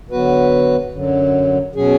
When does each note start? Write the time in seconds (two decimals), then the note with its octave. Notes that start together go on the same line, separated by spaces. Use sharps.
0.11 D3 F#3 B3 F#4 B4
0.92 F#2 D3 F#3
1.75 B2 F#3 C#4 G#4